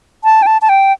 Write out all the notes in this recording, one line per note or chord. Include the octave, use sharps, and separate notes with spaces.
A5
G5
A5
A5
G5